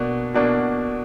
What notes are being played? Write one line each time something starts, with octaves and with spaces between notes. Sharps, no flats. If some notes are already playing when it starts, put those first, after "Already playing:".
Already playing: B2 A#3 D4 F#4
B2 A#3 D4 F#4